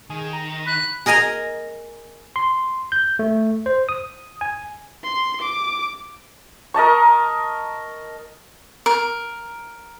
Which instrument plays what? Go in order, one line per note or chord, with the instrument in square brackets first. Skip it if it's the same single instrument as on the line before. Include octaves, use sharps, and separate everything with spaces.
[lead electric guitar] D#3 [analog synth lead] G#4
[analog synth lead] A#5
[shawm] B5 [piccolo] F#6
[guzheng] G#4 A#4 D#5 G#5 A#5
[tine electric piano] C6
G6
A3
C5
D#6
G#5
[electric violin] C6
D6
[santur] A#4 D#5 A5 C#6
[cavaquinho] A#4